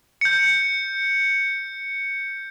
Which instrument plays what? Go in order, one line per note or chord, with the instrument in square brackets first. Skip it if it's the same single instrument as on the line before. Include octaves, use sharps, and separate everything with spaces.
[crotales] G6 C#7